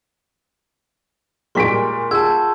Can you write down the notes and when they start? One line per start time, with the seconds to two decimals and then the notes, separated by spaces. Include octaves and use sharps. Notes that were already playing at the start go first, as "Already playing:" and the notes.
1.55 A#2 G3 G#3 A#4 C6 C#6 B6 D7
2.11 F4 G#4 F#5 A5 E6 G6 G#6